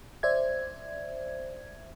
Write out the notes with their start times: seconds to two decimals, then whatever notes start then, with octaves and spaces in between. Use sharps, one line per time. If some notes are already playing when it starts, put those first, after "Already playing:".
0.23 C5 D5 E5 G#6